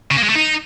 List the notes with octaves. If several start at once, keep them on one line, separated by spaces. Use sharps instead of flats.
C#3
A#3
G#3
A3
D#4